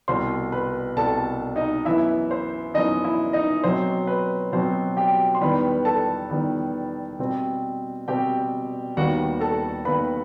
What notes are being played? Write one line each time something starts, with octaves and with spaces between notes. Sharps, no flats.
C2 B2 G3 C5 C6
B4 B5
C2 B2 G3 A4 A5
D#4 D#5
F#2 E3 B3 E4 E5
C5
F#2 E3 B3 D#4 D#5
E4 E5
D#4 D#5
B2 F#3 C4 C5
B4
B2 F#3 C4 C5
G4 G5
C6
E2 D#3 G3 B3 B4 B5
A4 A5
E2 D#3 G3 B3
B2 G3 C4
B2 G3 C4 G4 G5
D#2 D#3 G3 B3 F#4 F#5
A4 A5
D#2 D#3 G3 B3 B4 B5